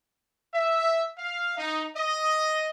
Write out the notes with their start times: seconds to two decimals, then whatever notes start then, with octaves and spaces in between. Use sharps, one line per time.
0.54 E5
1.18 F5
1.58 D#4
1.96 D#5